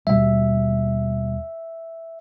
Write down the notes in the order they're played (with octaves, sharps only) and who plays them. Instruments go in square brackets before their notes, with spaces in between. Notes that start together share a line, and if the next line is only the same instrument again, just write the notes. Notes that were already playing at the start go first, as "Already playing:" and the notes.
[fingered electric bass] D#2 B2 G3 [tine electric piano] E5